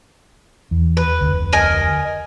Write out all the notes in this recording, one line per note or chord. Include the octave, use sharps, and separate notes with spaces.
E2
B4
F1 D2
A#4 D#5 G#5